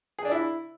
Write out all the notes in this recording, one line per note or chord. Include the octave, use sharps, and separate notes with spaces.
G#4
D4
E4